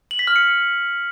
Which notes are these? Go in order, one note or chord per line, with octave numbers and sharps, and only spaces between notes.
F#7
B6
F6
C#7